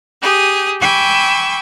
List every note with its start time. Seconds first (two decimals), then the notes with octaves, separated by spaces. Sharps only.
0.21 G4 G#4 D#6
0.80 G5 G#5 B5 C#6 D6 E6